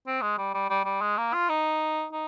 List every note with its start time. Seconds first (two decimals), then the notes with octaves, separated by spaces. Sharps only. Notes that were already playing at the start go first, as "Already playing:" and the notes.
0.07 C4
0.22 G#3
0.38 G3
0.55 G3
0.70 G3
0.85 G3
1.02 G#3
1.18 A#3
1.34 F4
1.49 D#4
2.12 D#4